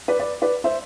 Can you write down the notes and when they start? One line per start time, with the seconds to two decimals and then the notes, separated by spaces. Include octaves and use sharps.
0.08 B4 D5
0.19 B4 D5
0.42 B4 D5
0.64 C5 E5